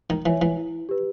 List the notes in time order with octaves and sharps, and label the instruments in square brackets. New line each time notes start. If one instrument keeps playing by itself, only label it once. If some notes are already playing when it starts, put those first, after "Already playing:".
[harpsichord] D#3
[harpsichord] E3 [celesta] C#5 E5 G#5
[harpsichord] E3
[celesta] E4
G4 B4